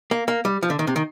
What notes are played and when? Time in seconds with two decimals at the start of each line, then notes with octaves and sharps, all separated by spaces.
0.11 A#3
0.28 A#3
0.45 G3
0.63 F3
0.70 D3
0.79 D#3
0.87 C3
0.96 D#3